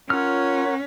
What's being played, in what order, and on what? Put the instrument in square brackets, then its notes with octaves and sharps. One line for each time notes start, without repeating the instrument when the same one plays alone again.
[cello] C#4 [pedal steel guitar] F4 F6 [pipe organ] A#4 C#5 F#5